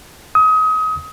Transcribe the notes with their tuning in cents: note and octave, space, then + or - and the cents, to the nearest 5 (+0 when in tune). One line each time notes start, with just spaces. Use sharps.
D#6 +30